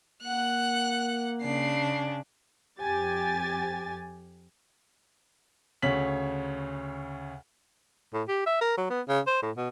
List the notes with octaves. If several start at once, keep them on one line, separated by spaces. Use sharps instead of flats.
A#3 F#5 F#6
C#3 D4 C7
F2 G4 G#5 A6
D2 C#3 C#5 B6 F#7
A2
G4
E5
A#4
F#3
B3
C#3
C5
A2
B2